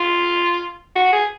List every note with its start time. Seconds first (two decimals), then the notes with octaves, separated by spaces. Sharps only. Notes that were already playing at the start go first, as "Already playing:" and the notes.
Already playing: F4
0.95 F#4
1.12 G#4